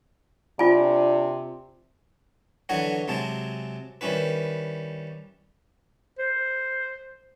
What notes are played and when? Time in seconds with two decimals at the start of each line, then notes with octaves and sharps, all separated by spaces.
0.59 C3 D4 F4 G#5
2.69 D3 E3 F#3 F#4 C#5 D#5
3.08 C3 F#3 G#3 G#4 A5
4.01 D#3 G3 C#4 E4 B4
6.19 C5